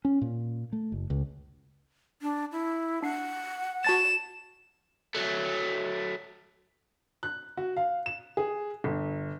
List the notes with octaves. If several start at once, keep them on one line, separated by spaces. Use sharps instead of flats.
C#4
A#2
A3
F#1
C#2
D4
E4
D4 F#5 C7
F#4 A5 A6 E7
F#3 A3
F#6
F#4
F5
E7
G#4
G1